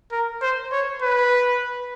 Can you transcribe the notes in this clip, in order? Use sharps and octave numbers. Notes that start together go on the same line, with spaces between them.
A#4
C5
C#5
B4